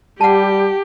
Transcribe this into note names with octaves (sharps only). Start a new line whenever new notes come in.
G3 G4 F#5 A5